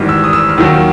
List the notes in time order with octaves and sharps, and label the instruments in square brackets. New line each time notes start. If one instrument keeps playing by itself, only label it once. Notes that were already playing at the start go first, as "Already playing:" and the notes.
Already playing: [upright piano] G#1 G#2 E3 G3
E6
D#6
E6
F6
D#2 D#3 F#3 E6